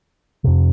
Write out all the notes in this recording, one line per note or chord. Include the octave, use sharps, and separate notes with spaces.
F2 C3